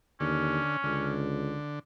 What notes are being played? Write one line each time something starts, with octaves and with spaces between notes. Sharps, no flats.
D#2 D3 C#4
C#2 D3